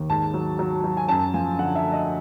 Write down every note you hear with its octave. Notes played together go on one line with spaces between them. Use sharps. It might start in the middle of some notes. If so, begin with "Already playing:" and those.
Already playing: D#2
G#2 A5
F#3
F#3
F#3
G#5
F#2 A5
F3 G#5
D3 F#5
E5
A3
D#5